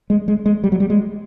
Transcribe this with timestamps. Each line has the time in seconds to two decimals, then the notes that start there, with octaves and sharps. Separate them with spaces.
0.10 G#3
0.28 G#3
0.46 G#3
0.64 G3
0.72 F#3
0.80 G3
0.90 G#3